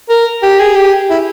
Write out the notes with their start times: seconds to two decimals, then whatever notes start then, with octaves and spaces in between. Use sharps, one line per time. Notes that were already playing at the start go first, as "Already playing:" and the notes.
0.10 A#4
0.42 G4
0.60 G#4
0.76 G4
1.10 E4